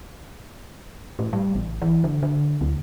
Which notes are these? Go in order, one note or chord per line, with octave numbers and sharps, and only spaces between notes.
A2
G3
A1
E3
D3
D3
D2